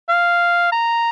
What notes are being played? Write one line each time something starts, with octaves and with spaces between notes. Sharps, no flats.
F5
A#5